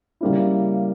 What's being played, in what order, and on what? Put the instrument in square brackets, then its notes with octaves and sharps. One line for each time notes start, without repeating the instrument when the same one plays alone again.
[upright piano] C#3 G3 A#3 E4